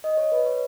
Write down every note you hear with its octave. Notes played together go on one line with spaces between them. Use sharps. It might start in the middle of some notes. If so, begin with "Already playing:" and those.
D#5
C#5
B4
C#5